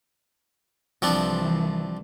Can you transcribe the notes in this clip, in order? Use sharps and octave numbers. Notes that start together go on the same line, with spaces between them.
C2 E3 F3 C4 D4